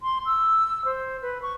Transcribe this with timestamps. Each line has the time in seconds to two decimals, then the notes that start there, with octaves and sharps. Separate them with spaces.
0.03 C6
0.26 E6
0.85 C5
1.22 B4
1.42 C#6